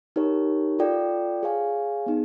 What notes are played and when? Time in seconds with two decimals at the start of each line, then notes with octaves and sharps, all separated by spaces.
0.16 D#4 G4 A#4 C#5
0.79 F4 A4 D5 G5
1.43 G#4 C#5 F5 G#5
2.06 B3 D#4 G#4